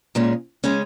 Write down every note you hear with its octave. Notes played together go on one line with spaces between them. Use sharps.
A#2 G#3 C#4
C#3 G#3 C#4